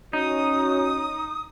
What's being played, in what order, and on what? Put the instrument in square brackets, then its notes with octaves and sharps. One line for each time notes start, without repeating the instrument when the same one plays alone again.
[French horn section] C#4 F#4 C#5 [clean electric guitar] D#4 [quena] D#6